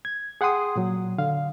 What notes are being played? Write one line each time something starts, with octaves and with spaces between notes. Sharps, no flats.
G#6
G#4 F#5 G5 C6 D#6
A#2 F#3
D3 F5